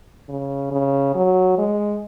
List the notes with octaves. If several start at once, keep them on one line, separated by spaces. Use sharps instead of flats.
C#3
C#3
F#3
G#3